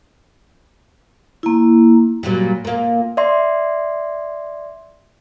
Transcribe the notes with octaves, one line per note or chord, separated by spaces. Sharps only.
A#3 E4
A#2 F#3 G3
A#2 A#3
D5 E5 C6